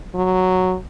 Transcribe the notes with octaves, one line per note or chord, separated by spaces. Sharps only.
F#3